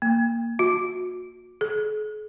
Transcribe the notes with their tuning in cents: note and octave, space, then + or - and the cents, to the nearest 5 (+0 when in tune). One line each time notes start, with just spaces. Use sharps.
A#3 -10
F#4 -35
G#4 +45